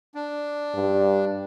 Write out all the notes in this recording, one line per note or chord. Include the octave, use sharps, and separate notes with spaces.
D4
G2